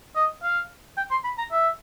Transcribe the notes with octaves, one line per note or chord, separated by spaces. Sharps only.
D#5
F5
G5
C6
B5
A#5
E5